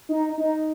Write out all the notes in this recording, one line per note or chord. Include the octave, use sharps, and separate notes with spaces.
D#4
D#4